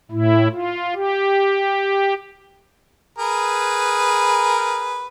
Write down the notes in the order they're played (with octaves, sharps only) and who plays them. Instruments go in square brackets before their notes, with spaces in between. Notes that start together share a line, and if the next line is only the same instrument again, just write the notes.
[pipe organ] A2 E4
F4
G4
[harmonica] G#4 A#4 B4